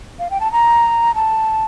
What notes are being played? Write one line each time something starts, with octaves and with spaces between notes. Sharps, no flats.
F5
G5
A5
A#5
A5